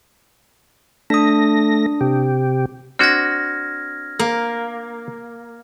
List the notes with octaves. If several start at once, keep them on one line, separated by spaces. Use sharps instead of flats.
A3 D4 D#6 A#6
C3 G4
C4 D4 F#4 F6 G#6 A#6
A#3